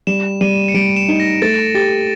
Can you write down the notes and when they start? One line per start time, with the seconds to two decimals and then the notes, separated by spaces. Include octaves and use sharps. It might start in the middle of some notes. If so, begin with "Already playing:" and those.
0.07 G3 E7
0.41 G3 D#7
0.68 C#7
0.74 G3 D7
0.96 E7
1.08 D#4
1.20 A#6
1.42 A3 A6
1.74 G4 A6